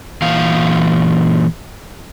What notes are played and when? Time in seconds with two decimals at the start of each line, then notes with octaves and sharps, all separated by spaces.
0.22 A#2 E3 F5